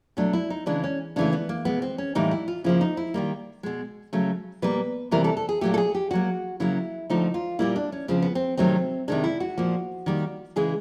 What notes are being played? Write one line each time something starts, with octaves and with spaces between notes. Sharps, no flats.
B2 F#3 A3 D4
E4
D#4
C#3 E3 G#3 D4
C#4
C#3 E3 A3 D4
B3
A#3
B2 G#3 B3
C4
C#4
A2 E3 G3 A#3 D#4
E4
F4
C#3 F3 A#3 E4
D#4
E4
D#3 G3 A#3
B2 G#3
C#3 F#3 A3
B2 G3 A#3 B4
C3 E3 G3 A#3 A#4
A4
A4
G#4
A#2 F#3 A3 G4
A4
G#4
G4
D3 F#3 A#3 F#4
C#3 F#3 A#3 E4
D3 F3 A3 D#4
F4
A#2 G3 A#3 E4
D4
C#4
C#3 F3 G#3 C4
B3
C4
C3 D#3 F#3 A3 C4
C3 D#3 G#3 D4
E4
F#4
A#2 F3 A#3
D#3 G3 A#3
C#3 E3 G#3 G#4